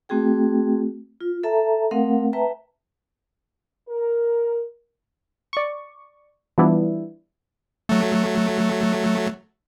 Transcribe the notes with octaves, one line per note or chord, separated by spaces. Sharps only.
A3 C4 F#4 G#4 G5
F4
A4 E5 A5 A#5
A3 C4 A#4 F5 F#5
B4 E5 G5 A5 A#5
A#4
D5 C#6
E3 F3 G3 B3 D4 E4
F#3 A3